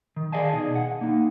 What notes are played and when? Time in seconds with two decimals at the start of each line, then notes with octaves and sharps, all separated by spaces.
0.16 D#3
0.32 G#4 D5 D#5 F5 G#5 A5
0.52 B2 D#4 G#4
0.76 F#5
1.01 A#3 D#4